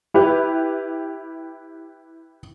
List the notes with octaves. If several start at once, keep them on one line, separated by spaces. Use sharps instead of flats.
E4 G4 B4